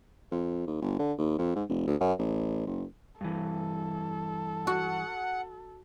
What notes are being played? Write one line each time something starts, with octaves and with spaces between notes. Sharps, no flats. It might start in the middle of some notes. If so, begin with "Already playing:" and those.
F2
D#2
G1
D3
D#2
F2
G#2
F1
D2
F#2
A1
F#1
G2 E3 A4
F#4 F#5